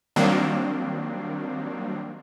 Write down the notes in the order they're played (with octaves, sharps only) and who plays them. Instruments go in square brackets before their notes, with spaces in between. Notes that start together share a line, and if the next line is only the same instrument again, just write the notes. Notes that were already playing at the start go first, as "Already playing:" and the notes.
[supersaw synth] D#3 F#3 G3 A#3 C4 D4